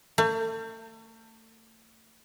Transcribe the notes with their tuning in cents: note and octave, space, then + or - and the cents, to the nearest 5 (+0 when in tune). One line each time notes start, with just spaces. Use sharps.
A3 +40